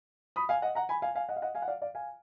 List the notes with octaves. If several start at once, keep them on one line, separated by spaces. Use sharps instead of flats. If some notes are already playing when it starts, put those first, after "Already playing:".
B5 D#6
F5 G#5
D#5 F#5
F#5 A#5
G#5 B5
F5 G#5
F5 G#5
D#5 F#5
F5
D#5 F#5
F5 G#5
F#5
D5 F5
D5 F5
F5 G#5